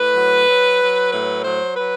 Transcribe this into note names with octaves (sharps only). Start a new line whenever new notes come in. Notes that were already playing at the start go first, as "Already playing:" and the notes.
Already playing: A2 B4
F#3
F#3
F#3
A2 B4
F#3 C5
F#3 B4